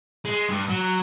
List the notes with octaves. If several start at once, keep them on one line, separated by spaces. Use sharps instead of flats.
G#3
G2
F#3